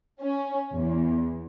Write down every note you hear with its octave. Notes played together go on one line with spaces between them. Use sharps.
C#4
E2